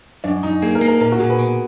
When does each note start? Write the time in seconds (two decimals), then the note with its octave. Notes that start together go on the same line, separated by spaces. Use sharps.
0.24 F#2 D4
0.43 F#2 D#4
0.62 A#3 G#4
0.75 A#4
0.81 A#3
0.88 A#4
1.00 A#2 A#4
1.12 F#4
1.20 A#2 G#4
1.30 B4
1.39 B2